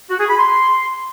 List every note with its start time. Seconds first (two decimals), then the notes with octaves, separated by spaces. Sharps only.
0.09 F#4
0.19 G#4
0.29 B5
0.38 C6